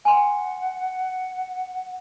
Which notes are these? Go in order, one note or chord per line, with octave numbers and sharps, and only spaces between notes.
F#5 G#5 C6